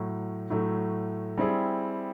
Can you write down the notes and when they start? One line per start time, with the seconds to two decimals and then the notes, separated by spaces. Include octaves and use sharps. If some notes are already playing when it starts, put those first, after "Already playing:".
Already playing: A2 F#3 A3
0.50 A2 F#3 A3
1.38 G3 C4 E4 G#4